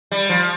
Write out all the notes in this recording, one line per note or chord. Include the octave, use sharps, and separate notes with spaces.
G3
F3